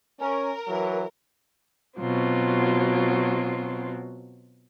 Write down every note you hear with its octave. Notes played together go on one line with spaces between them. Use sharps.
C#4 A#4
E3 F#3
B2 F#3 C4 F4